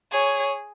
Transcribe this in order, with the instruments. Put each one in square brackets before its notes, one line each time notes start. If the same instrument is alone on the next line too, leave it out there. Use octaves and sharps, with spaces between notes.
[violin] G#4 [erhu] C#5